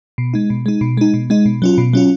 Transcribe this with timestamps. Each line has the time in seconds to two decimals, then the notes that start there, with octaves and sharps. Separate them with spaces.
0.18 B2
0.34 G#3 D#4
0.50 B2
0.66 G#3 D#4
0.81 B2
0.97 G#3 D#4
1.14 B2
1.30 G#3 D#4
1.46 B2
1.62 F#3 C#4 F4
1.78 B2
1.93 F#3 C#4 F4